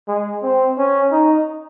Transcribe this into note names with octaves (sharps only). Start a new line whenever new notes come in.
G#3
C4
C#4
D#4